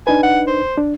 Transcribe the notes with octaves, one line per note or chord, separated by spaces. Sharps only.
D4 D#4 B4 G#5
F#5
C5
D4